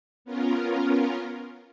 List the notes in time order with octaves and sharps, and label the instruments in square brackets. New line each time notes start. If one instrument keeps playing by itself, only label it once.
[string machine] B3 C#4 F4 A#4